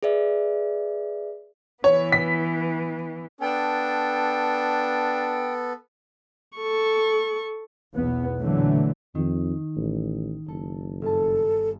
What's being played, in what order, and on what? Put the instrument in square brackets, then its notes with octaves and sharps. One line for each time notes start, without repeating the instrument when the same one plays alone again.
[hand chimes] G#4 B4 D5 E5
[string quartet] E3 B3 [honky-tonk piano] C#5
[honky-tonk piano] B6
[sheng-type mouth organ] B3 A4 [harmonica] D4 [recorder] G5
[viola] A4 C#6
[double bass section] B1 E2 B3
A#2 D3 E3 F#3 A3
[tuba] F2 [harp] D#3
[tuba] A1
[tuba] F#1 [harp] A4
[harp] G1 A5 [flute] A4